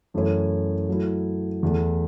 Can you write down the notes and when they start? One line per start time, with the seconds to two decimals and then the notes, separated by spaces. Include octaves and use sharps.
0.14 F#2 E3 A3 E4 C#5
0.89 F#3 A3 E4
1.63 E2 E3 A3 E4